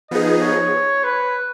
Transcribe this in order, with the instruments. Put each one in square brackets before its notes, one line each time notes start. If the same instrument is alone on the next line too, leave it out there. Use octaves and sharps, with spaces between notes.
[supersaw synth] F3 B3 D#4 G#4 [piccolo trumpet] D#5
[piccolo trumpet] C#5
B4